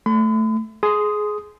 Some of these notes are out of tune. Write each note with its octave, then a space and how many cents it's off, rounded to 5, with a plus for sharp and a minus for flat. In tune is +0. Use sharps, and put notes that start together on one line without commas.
A3 +0 B5 +45
G#4 +20 C6 -15 D#6 +0